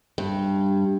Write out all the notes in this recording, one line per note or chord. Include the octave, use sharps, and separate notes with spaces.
G2